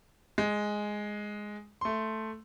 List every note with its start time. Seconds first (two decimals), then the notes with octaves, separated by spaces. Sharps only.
0.38 G#3
1.81 A3 C6